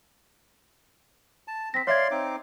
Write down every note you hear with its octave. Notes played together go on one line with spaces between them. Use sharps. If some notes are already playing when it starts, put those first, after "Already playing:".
A5
C4 A#6 B6
C#5 D5 E5 F5 C6 G#6
C4 D#4 D6